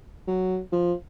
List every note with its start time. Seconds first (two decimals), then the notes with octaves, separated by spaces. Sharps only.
0.27 F#3
0.72 F3